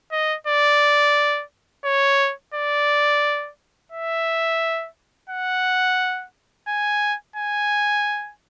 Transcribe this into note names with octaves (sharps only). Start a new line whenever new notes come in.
D#5
D5
C#5
D5
E5
F#5
G#5
G#5